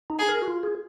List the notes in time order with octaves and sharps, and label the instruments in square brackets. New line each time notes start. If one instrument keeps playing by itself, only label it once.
[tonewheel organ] D#4
[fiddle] G#4
[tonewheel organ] A#4
F#4
F4
G#4